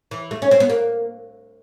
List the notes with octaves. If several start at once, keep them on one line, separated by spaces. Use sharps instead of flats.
E3
A3
C#4
C4
B3
A#3